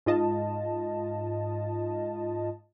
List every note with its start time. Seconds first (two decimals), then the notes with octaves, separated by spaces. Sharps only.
0.06 G#2 F4 D#5 A5